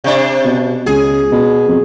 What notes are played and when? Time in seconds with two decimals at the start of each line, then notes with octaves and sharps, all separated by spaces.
0.04 C3 D4
0.45 B2
0.86 C#2 G#4
1.32 B2
1.68 F2